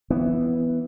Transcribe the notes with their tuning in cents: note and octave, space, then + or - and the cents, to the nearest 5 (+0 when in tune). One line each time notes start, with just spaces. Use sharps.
E3 +0 B3 +0